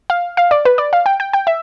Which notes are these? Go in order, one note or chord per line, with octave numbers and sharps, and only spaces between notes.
F5
F5
D5
B4
D5
F5
G5
G5
G5
E5